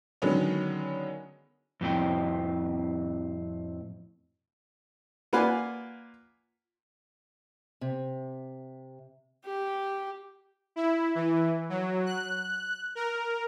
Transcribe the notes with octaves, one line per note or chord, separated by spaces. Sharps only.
D3 D#3 F#3 G#3 B3 C#4
F2 A2 C4 G5
A#3 F4 B4 D5 F#5 G#5
C3
G4
E4
E3
F#3
F#6
A#4